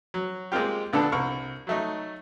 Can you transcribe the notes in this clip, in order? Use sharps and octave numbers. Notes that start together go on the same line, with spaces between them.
F#3
G#3 A#3 C4 F4 G4
A#1 D3 B3 D4 A4
C2 A#4 C#6
F#3 A3 D#4